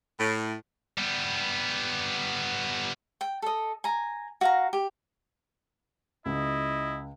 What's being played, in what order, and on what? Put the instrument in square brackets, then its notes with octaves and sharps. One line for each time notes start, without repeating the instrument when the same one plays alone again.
[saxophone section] A2
[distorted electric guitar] G3 B3
[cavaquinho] G5
A4 D#5
G#5 A#5
F#4 F5 A#5
G4
[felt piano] C#2 [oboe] E4 [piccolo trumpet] D#5